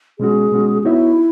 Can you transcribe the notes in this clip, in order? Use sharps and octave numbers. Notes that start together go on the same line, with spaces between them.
B2 G#3 C#4 F#4 G#4
B2 G#3 C#4 F#4
B3 D#4 E4 F#4 C#5 E5